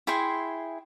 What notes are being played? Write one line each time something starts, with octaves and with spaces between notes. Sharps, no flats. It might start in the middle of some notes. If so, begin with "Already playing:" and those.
E4 G#4 G5 C6